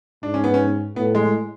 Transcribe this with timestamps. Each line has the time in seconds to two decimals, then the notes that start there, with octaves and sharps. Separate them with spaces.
0.23 G#2 D4
0.34 C#4
0.44 B3
0.54 C#4
0.96 A2 B3
1.15 G#3